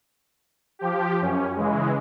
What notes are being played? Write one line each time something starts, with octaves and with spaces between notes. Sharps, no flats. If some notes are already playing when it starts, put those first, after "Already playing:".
F3 G4
F#2 C#4
C#3 E3 G#3